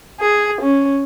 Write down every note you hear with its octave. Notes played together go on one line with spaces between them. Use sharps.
G#4
C#4